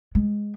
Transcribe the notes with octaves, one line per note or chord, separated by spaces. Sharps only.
G#3